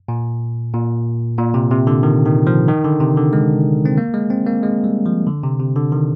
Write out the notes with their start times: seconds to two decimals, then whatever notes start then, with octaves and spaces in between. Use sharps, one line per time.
0.08 A#2
0.74 A#2
1.38 A#2
1.54 C3
1.71 C3
1.87 D3
2.03 D#3
2.25 D#3
2.47 F3
2.68 D#3
2.84 D3
3.00 C3
3.17 D3
3.33 G#3
3.85 C4
3.98 A#3
4.14 G#3
4.30 C4
4.47 A#3
4.63 G#3
4.84 G3
5.06 F3
5.27 D3
5.43 C3
5.59 C3
5.76 D3
5.92 D#3